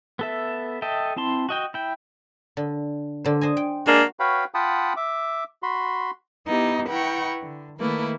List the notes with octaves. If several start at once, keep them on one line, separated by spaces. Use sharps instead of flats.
B3 A4 E5
A4 D#5 E5 G5
C4 E4 A5 C6
F#4 D#5 G5
E4 G5
D3
D3 C5
C5 D#5 G#5
G5
G#3 A#3 D4 F#4
F#4 B4 C#5 F5 G5 B5
F4 F#5 G5 A5 B5 D#6
E5 D6
F#4 B5 C6
B3 D#4 E4 G4
E4 B4 F#5 G5 A#5 C#6
D3
D#3 A3 A#3 E4 B4